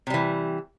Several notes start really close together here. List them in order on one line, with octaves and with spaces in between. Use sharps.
C3 G3 E3